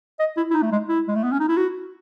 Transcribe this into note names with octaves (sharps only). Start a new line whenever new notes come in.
D#5
E4
E4
D#4
A3
G#3
E4
G#3
A3
B3
C#4
D#4
E4
F#4